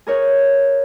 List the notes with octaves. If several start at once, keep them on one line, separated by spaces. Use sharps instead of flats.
G#4 A#4 C#5